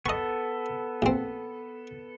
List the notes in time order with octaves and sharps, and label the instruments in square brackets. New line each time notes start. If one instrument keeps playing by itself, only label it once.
[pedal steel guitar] B3 A4 [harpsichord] D#5 C#6
[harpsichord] A#1 C4